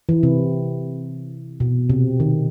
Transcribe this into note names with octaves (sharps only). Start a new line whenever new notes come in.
E3
C3
B2
C3
D#3